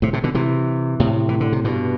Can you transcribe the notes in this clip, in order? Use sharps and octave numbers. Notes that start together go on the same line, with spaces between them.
A2 C3
A2 C3
B2 D3
C3 E3
A2 C3
E3
D3
C3
G2 B2